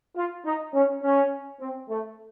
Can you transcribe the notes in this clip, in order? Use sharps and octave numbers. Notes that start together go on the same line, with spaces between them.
F4
D#4
C#4
C#4
C4
A3